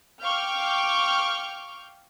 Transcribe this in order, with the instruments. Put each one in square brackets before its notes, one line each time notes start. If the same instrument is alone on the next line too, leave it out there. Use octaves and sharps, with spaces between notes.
[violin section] F5 G5 C#6 D6 F6 G6